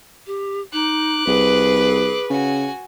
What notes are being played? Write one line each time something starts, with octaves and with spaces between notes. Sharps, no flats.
G4
D#4 D6 F#6
C2 G#4 B4
C#3 F#4 G#5